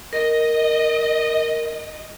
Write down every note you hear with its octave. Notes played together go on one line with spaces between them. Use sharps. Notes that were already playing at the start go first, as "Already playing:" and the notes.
A#4 D#5